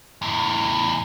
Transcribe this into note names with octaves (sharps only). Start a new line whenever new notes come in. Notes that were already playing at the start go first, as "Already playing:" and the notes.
E2 A2